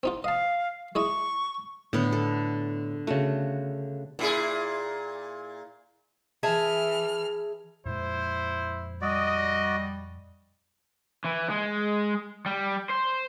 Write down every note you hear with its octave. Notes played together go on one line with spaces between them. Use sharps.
C4 D#4 F4
D#5 F5 A5
G#3 E4 D#5 C#6
A2 D3 B3
A4
C#3 A3 F#4
A#2 E4 G#4
E3 G#4 E5 A5 F6
F2 A#2 G#3 E4 C5
G3 F#4 D5 D#5
E3
G#3
G3
C5